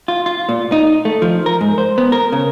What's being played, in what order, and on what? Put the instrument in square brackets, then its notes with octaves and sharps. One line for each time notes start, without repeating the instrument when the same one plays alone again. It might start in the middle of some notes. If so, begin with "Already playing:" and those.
[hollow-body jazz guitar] F4
F4
A#2
D#4
A3
F3
A#4
G#2
C5
B3
A#4
C#3